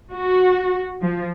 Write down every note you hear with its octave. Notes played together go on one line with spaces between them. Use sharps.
F#4
F3